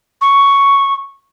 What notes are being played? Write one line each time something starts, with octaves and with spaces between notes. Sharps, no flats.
C#6